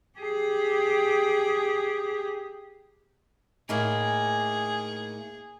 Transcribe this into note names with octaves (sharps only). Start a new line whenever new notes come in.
G4 G#4
A2 A#3 D#4 G#4